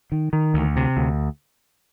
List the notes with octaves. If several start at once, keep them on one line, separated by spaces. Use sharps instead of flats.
D#3
D#3
D2
C3
D2